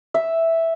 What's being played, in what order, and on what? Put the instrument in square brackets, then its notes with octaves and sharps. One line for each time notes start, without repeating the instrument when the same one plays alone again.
[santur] E5